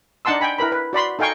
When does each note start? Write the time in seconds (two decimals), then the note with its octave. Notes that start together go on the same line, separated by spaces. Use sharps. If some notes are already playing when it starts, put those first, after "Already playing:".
0.25 D4 D#4 F#5 A5 C6 E6
0.41 G5 G#5 B5
0.58 E4 A#4 B4 B5
0.72 B4
0.93 F#4 D5 B5 C6
1.19 D#4 A4 F5 G5 G#5 C#6